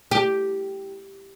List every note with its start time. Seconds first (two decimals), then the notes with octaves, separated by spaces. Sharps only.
0.11 G4